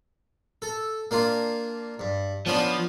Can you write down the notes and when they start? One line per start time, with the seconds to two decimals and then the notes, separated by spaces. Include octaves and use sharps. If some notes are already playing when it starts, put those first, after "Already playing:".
0.62 A4
1.11 A#3 D4 F4
2.00 G2
2.46 F3 B3 C#4 D4